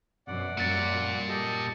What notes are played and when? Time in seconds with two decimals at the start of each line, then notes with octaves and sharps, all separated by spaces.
0.27 F#2 B2 D5 F#5
0.58 F#2 A#2 G3 A6 C#7
1.29 G4 A4 D#5